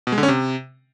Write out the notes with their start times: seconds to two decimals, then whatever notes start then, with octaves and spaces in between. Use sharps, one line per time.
0.07 B2
0.12 G#3
0.18 D3
0.23 C#4
0.28 C3